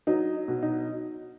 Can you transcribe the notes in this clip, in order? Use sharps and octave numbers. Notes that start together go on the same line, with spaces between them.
F#3 D#4
B2
D#4